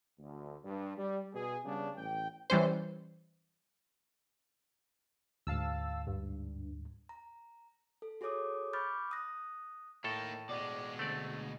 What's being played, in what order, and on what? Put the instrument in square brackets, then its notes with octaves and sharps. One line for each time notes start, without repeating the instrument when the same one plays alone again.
[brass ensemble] D2
G2
G3
B2 G#4
C#3 G3 B3 D4
A1 G5
[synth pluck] E3 G3 C#4 C5
[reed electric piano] D2 G#2 [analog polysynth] F5 A5 E6
[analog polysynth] G2
[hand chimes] A#5
A4
F#4 G#4 A4 C#5 D6 D#6
B5 C#6 D6 F6 G6 A6
D#6 F#6 A#6
[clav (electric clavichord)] A2 A4 [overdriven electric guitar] A#3 D#4
[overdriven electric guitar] B2 G#3 [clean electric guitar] D5
[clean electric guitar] D2 [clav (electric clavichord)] A3 C4 D5